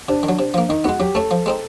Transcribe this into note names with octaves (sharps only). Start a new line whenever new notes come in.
C3 D4
D#3
F#3
C3
F3 A#3
D#3 D#4
G#3 B3 F#4
F#3 G4
A3 C#4 A4
F3
G#3 C4 D#4